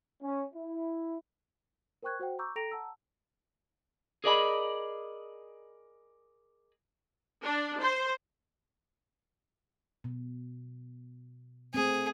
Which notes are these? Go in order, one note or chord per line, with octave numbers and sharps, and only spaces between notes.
C#4
E4
A#4 C5 G5 C#6 F#6 G#6
F#4 C5 F#5 G5
A#5 C#6 D6 E6 G6
A4 G5 A#5 A#6 D7 F7
F#5 A5 A#5 E6
G#4 A#4 D5 D#5 G#5 B5
D4
C5
B2
A3 C4 G#4